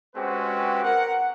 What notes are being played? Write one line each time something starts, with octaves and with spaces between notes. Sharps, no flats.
G#3 C4 C#4 F#4 G4 B4
A#4 F#5